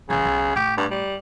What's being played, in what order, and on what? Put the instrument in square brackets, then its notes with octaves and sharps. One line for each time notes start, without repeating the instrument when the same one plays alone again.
[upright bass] B1 E3 [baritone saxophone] C#3
[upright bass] B1
[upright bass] A2 [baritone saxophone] G4
[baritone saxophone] G2
G3